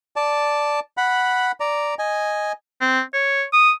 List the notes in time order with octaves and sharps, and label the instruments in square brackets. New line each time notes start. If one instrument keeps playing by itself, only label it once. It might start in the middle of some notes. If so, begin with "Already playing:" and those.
[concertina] D5 A5
F#5 B5
D5 A#5
D#5 G#5
[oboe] C4
C#5
D#6